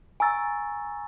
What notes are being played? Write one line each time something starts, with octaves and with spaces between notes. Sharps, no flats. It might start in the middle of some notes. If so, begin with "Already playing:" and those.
G#5 A#5 C#6 E6 A6